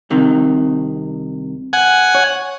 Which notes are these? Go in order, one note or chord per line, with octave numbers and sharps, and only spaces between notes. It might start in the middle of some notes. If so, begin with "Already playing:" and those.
C2 C3 D#3
F#5 G#5
C#5